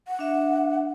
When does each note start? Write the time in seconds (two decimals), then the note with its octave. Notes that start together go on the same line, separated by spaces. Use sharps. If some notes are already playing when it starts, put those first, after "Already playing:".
0.08 F#5
0.19 D4 E5